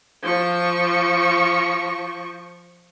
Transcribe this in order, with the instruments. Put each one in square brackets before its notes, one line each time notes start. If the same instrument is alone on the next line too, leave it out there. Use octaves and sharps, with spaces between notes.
[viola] F3 C#6